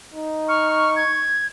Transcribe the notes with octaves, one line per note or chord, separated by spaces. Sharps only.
D#4
C#6 F6
G#6